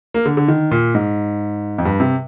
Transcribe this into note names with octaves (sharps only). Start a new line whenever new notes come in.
A#3
D3
D3
D#3
A#2
G#2
F2
G2
C3